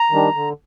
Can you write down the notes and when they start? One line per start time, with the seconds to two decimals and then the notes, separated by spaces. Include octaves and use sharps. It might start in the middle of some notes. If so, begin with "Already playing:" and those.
Already playing: A#5
0.11 D#3 G3 D4
0.35 D3